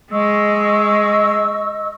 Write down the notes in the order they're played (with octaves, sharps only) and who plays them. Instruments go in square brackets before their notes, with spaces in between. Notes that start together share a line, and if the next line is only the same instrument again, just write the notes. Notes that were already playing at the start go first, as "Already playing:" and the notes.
[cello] G#3 [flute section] D#5 C#6 E6